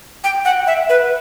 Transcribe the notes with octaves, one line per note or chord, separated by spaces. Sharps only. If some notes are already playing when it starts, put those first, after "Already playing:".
G5
F#5
E5
B4